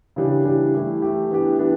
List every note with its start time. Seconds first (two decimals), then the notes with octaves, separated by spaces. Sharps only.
0.16 C#3 E3 G3 D4
0.44 C#3 E3 G3 D4
0.74 E3 A3 E4 G4
1.02 E3 A3 E4 G4
1.30 E3 B3 D4 G4
1.59 E3 B3 D4 G4